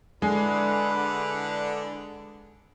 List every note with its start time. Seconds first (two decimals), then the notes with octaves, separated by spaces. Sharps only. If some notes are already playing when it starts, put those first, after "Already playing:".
0.22 D3 G#3 D4 E4 B4